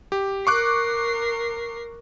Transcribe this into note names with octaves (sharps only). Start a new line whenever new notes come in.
G4
A#4 C#6 D6 F#6 C7